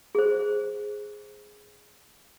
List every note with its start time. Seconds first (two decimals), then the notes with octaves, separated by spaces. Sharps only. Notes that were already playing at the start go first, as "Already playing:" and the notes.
0.15 G#4 C5